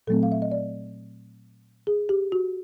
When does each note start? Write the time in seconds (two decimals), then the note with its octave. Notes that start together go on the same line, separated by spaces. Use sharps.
0.07 A#2 F#3 A3 C4 A4
0.23 F5
0.32 E5
0.42 D#5
0.51 D5
1.87 G#4
2.09 G4
2.32 F#4